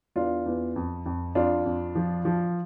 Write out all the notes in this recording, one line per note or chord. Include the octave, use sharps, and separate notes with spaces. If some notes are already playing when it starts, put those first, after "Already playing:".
E2 D4 F4
E2
F2
F2
F2 D4 F4
F2
F3
F3